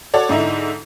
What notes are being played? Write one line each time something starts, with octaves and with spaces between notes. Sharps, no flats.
F#4 A4 C#5 D5
G#2 D3 D#4 E4